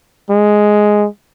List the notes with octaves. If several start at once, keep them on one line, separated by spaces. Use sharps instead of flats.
G#3